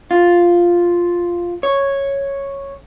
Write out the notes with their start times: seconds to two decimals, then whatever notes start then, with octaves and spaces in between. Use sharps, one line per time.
0.11 F4
1.63 C#5